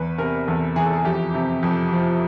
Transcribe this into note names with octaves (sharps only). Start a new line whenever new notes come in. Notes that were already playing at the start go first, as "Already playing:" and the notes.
Already playing: E2 B4
C3 A#4
E2 A4
E3 G#4
A4
G#4
F2 G4
C3
F2
F3